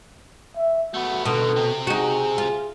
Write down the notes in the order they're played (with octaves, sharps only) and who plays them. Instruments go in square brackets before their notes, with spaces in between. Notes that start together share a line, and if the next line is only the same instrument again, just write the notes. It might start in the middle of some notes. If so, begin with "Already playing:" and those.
[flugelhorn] E5
[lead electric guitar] A3 B3 [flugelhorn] F#4
[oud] B2 [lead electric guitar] D3 D#3 [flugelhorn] A4
[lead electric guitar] C3 C4
[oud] D#4 F#4 [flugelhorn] G#4
[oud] F4